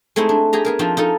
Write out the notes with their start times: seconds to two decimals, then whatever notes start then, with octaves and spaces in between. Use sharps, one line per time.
0.16 G#3 A3 C4 D#4 E4
0.29 D4
0.53 G4 G#4 A#5
0.65 B3 G#4 A#4
0.79 F3 C4 D4 D#4 F4
0.97 D#4 F4 A4